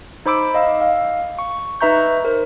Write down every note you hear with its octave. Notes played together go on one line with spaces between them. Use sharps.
D#4 C5 B5 D6 E6 D7
D#5 F5 E6
F5
C#6
D#4 B4 E5 A#5 C#6 G6
A#4 C5